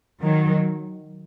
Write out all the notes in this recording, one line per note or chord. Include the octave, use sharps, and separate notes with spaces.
D#3 F#3